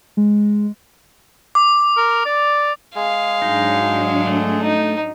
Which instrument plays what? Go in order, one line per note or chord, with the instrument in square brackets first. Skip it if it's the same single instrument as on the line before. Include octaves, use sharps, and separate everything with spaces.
[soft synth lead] G#3
[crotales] D6
[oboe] A#4
D5
[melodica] G#3 G#4 [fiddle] F5
[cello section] G#2 F#3 D4 [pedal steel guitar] D#4
[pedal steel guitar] A3
[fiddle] D#4